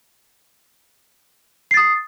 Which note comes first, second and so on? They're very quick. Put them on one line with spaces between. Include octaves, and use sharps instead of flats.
C7 A6 D#6